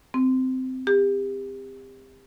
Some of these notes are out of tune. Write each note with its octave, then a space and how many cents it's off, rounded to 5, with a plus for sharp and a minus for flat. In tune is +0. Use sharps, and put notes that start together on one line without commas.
C4 -15
G4 +30